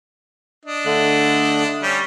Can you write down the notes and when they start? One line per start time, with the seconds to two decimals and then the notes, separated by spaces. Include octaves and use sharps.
0.65 D4 D#5
0.86 D3 A3 F#6
1.82 G3 C#4